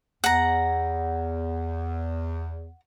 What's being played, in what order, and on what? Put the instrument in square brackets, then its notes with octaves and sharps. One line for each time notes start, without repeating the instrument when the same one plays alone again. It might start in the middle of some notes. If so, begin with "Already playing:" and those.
[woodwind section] E2 [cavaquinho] F#5 A#5